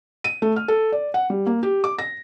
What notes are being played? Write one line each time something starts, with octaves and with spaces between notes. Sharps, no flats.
D#7
A3
F6
A4
D5
F#5
G3
A#3
G4
D6
A#6